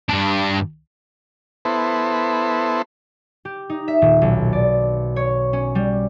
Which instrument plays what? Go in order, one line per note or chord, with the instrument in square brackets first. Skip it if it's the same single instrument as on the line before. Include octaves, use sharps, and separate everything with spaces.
[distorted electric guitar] G2 D4
[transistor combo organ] B3 E4 A4 C5
[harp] G4
D#4
E5
D#1
B1
D5
C#5
C#4
G3